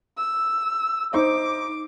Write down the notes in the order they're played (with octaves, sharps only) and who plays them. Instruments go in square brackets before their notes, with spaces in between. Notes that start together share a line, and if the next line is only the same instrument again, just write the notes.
[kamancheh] E6
[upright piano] D#4 C5 [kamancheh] D6